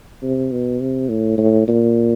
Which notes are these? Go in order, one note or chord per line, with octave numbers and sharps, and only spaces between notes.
C3
B2
C3
A2
A2
A#2